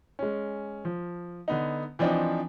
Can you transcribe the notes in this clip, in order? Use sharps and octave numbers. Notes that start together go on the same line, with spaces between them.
G#3 C#4
F3
D3 B3 D#4
E3 F3 C4 D4 D#4